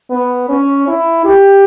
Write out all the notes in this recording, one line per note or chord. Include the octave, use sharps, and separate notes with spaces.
B3
C#4
E4
G4